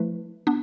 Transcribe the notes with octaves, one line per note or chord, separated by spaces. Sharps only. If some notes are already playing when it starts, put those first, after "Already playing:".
Already playing: F3 A3 E4 B4
B3 D4